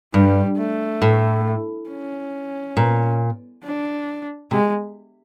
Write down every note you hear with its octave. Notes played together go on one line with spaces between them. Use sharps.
G2 G3
A3
A2
C#4
A#2
D4
C3 G#3